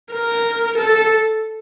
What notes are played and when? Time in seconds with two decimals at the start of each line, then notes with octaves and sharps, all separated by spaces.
0.13 A#4
0.78 A4